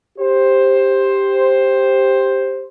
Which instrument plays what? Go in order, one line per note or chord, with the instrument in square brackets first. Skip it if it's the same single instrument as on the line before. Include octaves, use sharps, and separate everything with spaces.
[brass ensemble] G4 C5